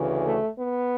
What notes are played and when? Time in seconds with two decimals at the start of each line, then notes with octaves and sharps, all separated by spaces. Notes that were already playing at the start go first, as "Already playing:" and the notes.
Already playing: D2 C#3 E3
0.24 A3
0.59 B3